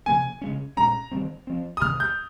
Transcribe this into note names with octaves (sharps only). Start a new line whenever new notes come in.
C3 F3 A#3 C#4 G#5
C#3 G#3 C#4
A#2 G#3 C#4 A#5
D#3 G3 C4
F3 C4
D#6
C3 D#3 A#3 F6
G6